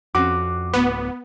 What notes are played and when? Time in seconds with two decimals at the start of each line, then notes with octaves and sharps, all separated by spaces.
0.15 F2 C4 C#4 F#4 D6
0.74 D1 A2 B3